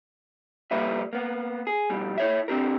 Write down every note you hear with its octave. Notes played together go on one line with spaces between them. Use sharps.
C2 F2 G3 A#3 B4 E5
A#3 B3
G#4
F2 B2 G3
E4 C#5 E5
C4 D4 G4 A#4